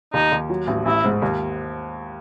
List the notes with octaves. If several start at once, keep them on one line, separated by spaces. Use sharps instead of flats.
D#2 D#4
D#2
F#3
A1
A1 E4
G#2
D#2